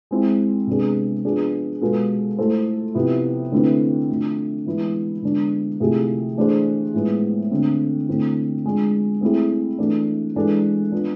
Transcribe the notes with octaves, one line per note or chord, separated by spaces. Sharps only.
G#3 C4 E4
C3 G#3 B3 D4 G#4
F3 B3 D4 G#4
B2 G#3 B3 F4 A4
A3 E4 A4 C5
C3 F3 B3 E4
D3 A3 C4 E4 B4
D3 F3 A3
E3 G#3 B3 E4
D3 G#3 B3 D4
C3 F3 A3 E4 G#4
E3 A3 D4 G#4 C5
A2 F3 G#3 B3
D3 A3 C4
D3 A3 C4 E4
F3 G#3 D4
A3 C4 E4 G#4
E3 A3 D4
E3 G#3 D4 A4
F3 B3 D4 F4